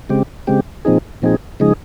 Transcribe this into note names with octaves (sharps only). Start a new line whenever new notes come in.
C#3 G#3 C4 G4
C#3 G#3 C4 G4
A#2 F3 C4 D#4 G#4
A#2 F3 C4 D#4 G#4
C#3 F3 G#3 D#4 G#4